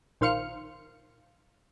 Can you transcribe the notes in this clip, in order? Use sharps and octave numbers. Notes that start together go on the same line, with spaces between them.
A#1 D#3 C5 F5 F6 C#7